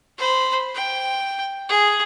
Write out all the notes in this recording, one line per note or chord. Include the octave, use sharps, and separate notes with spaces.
C5 B5
G5
G#4